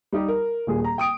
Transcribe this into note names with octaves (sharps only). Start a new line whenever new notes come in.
G3 D#4 G4
A#4
D#1 A#2 G#4
A#5
G5 D#6 D7